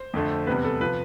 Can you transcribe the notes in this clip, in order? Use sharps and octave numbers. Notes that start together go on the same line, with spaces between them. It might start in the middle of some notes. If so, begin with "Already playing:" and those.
Already playing: C5
F2 D3 A3
E2 C3 G3 B3 B4
A4
C3 F3 B4